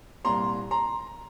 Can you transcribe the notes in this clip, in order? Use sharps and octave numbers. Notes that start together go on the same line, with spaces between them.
C2 A#2 A#5 C6
A#5 C6